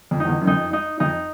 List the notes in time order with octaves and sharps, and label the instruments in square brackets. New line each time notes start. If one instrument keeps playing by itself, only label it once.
[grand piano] F2
[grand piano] E2 [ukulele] D#4
[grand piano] F2
F#2
[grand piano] F2 [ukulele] D#4
[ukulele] D#4
[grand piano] F2 [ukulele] D#4